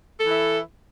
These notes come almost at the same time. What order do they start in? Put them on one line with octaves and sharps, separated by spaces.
A4 E3 E4